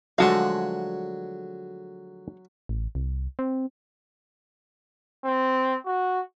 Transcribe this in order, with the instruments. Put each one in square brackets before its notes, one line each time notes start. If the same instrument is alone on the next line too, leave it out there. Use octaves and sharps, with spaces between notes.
[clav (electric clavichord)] D3 F3 A3 [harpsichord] F#3 F#5 [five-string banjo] G#3 F#4 F5
[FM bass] A1
C2
C4
[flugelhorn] C4
F#4